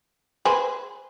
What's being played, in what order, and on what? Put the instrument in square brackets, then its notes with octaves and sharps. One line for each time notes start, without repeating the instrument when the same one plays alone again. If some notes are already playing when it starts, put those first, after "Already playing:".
[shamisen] G#4 B4 C5